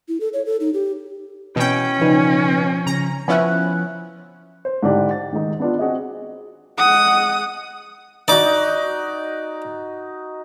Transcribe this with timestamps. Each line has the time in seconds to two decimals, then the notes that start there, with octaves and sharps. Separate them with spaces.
0.08 E4
0.20 A4
0.33 C#5
0.46 A4
0.60 D#4
0.74 G4
1.56 B2 E3 C#4 G5
2.01 C#3 F3 D#4 B4 D5
2.87 C#3 A#5
3.28 F3 B3 C#4 E4 G#5 F#6
4.65 C5
4.83 G#2 D3 D4 E4 G4
5.11 A6
5.33 D#3 G#3 D#4
5.60 B3 D4 F4
5.79 C4 F#4 G#4 D#5
6.78 G#3 F#5 D#6
8.28 D#4 F#4 D5 D6